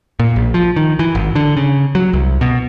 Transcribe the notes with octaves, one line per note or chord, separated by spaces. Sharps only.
A#2
A#1
F3
D#3
E3
G#1
D3
C#3
F#3
C2
B2